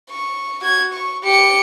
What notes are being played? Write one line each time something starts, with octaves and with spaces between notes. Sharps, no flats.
C#6
F#4 G#6
C#6
G4 C#7